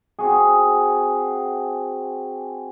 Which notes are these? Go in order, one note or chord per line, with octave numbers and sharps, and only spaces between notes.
C4 F#4 G#4